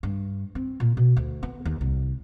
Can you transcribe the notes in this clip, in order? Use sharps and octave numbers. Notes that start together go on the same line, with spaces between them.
G2
C4
A#2
B2
D2
B3
D#2
C2